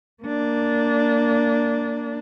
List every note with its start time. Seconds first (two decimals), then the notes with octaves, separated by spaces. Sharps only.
0.23 A#3 D4